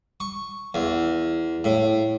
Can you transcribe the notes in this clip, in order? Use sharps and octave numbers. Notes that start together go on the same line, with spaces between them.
C#6
E2
A2